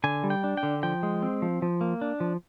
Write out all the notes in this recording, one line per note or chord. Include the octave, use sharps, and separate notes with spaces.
D3 G#5
G3
G5
D4
G5
D3
F3 G5
G#3
C4
F3
F3
A#3
D4
F3